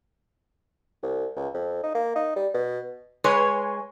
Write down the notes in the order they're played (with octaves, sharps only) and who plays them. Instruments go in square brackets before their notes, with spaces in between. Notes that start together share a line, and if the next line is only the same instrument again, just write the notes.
[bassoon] C2
C#2
F2
D#4
A#3
D#4
G3
B2
[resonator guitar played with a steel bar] G#3 C#5 [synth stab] B4 G#5 C6